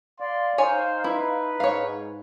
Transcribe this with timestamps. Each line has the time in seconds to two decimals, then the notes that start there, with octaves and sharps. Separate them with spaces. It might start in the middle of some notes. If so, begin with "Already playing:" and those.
0.20 D5 F5 C6
0.58 D#4 C5 C#5 G#5
1.04 E4 B4
1.60 G#2 C#5 F5